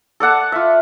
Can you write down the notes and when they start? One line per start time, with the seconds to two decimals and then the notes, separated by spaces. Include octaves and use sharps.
0.20 A4 D5 F#5 A5
0.52 F4 E5